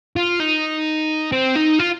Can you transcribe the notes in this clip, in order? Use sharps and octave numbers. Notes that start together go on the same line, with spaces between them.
F4
D#4
C4
D#4
F4